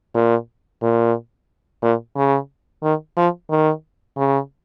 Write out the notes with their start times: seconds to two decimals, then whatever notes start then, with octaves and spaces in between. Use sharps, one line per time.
0.15 A#2
0.82 A#2
1.83 A#2
2.17 C#3
2.83 D#3
3.17 F3
3.50 D#3
4.18 C#3